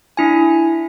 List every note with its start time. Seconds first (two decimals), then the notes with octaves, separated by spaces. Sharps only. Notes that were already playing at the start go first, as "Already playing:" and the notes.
0.17 D4 E4 G#5